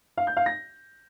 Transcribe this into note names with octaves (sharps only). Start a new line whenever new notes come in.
F5
G6
F5
A#6